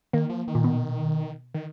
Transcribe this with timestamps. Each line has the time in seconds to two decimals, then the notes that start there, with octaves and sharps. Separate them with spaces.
0.13 D#3 A#3
0.30 F3
0.48 D#3
0.55 A#2
0.64 B2
1.54 D#3